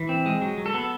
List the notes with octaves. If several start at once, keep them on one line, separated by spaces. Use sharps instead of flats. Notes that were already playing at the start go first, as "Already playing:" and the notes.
Already playing: E3
C4
G#3
F#3
F#3
A4
B3